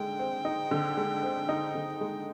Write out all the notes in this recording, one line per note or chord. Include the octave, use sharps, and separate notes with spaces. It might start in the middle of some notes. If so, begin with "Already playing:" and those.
Already playing: D3 G#3 D#4 G5
C4
D#4
D3
G#3
C4
D#4
D3
G#3